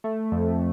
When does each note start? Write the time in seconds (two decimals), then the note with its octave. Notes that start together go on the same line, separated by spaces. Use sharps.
0.04 A3
0.32 F2